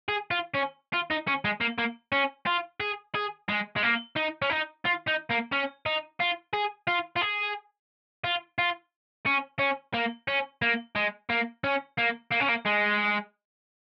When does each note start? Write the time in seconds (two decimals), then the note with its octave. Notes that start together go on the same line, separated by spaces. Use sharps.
0.09 G#4
0.31 F4
0.54 C#4
0.93 F4
1.10 D#4
1.27 C#4
1.45 G#3
1.61 A#3
1.79 A#3
2.12 C#4
2.46 F4
2.80 G#4
3.15 G#4
3.49 G#3
3.76 G#3
3.83 A#3
4.16 D#4
4.42 C#4
4.50 D#4
4.85 F4
5.07 D#4
5.30 A#3
5.52 C#4
5.86 D#4
6.20 F4
6.53 G#4
6.87 F4
7.16 F4
7.22 G#4
8.24 F4
8.58 F4
9.26 C#4
9.59 C#4
9.94 A#3
10.28 C#4
10.62 A#3
10.96 G#3
11.30 A#3
11.64 C#4
11.98 A#3
12.31 A#3
12.40 C#4
12.48 A#3
12.65 G#3